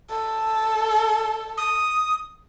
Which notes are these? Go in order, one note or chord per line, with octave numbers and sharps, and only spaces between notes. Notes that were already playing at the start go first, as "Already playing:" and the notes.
A4
D#6